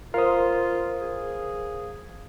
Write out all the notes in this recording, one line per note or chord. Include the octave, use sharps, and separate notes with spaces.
F4 A#4 C5 F5 D#6
G#4